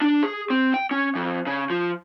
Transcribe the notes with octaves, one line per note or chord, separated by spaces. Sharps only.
D4
G#4
C4
G5
C#4
F2
C#3
F3